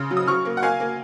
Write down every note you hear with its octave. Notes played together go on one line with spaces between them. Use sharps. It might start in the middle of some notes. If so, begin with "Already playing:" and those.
Already playing: C#3 C6
F#3
D#6
F#3 C#6 F6
A#3
F#5
A#3 F5 G#5
A#3